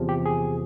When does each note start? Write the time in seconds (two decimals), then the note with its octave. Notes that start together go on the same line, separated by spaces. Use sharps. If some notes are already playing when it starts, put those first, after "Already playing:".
Already playing: E2 C3 F3
0.09 G4
0.26 G#4